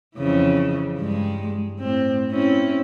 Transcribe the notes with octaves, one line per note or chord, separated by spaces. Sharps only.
F2 C#3 E3
G2 G#3
A2 C4
C4 C#4 E4